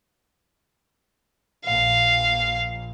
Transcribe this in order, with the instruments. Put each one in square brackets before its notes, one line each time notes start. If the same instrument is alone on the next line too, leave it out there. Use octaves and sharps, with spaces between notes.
[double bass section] A#1 A#2 [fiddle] F5